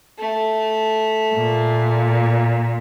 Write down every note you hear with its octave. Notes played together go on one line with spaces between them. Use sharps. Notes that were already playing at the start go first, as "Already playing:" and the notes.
A3
A#2